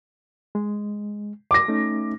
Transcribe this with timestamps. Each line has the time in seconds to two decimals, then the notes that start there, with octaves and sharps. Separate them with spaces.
0.55 G#3
1.51 D6 A#6
1.68 A3 C#4 D#4